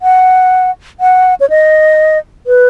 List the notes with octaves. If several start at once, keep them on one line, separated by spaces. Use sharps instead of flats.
F#5
F#5
C#5
D#5
B4